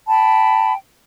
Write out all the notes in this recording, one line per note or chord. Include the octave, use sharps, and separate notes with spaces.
G5 A5 B5